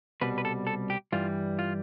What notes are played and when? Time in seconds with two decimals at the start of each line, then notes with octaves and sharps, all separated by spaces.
0.21 C2 B2 G3 B4
0.38 B4
0.45 A4
0.67 A4
0.90 G4
1.12 G2 E3 G3 F4
1.59 F4